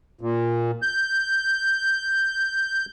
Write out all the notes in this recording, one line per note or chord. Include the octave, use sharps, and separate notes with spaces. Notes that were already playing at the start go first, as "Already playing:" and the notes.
A#2
G6